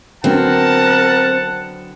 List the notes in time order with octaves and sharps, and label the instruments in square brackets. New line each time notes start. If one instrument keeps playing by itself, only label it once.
[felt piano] D3 F#3 B3 [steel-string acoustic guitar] C4 [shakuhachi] A#4 [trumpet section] F#5 A5